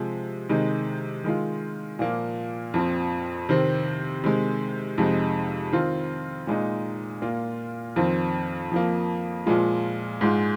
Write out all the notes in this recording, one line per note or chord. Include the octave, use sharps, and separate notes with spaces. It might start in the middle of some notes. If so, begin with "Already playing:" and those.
Already playing: C3 F3 G#3
C3 D#3 G#3 D#4
D#3 G#3 F4
A#2 F3 A#3
F2 F3 C4
C3 D#3 C4
C3 D#3 G#3
F2 C3 G#3 D#4
D#3 C4 F4
A#2 G#3 D#4
A#2 A#3 F4
F2 D#3 C4 F4
F2 F3 A#3
A#2 F3 G#3 F4
G#2 G#3 F4